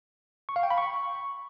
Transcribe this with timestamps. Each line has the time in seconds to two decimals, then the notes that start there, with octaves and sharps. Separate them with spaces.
0.49 C#6
0.56 F5
0.63 G5
0.71 B5
0.78 C#6